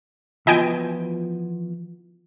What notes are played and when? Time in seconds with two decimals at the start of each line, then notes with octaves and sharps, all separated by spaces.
0.47 E3 F3 B3 F4 F#4 D#5 G5 G#5